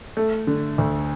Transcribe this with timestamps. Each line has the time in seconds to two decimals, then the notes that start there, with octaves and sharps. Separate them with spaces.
0.17 A3
0.47 D3
0.78 D2